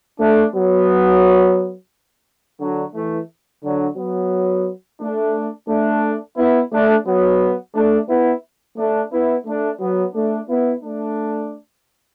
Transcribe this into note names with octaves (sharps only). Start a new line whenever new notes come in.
A3 D4
F#3 B3
D3 F#3
E3 A3
D3 F#3
F#3 B3
A3 D4
A3 D4
B3 E4
A3 D4
F#3 B3
A3 D4
B3 E4
A3 D4
B3 E4
A3 D4
F#3 B3
A3 D4
B3 E4
A3 D4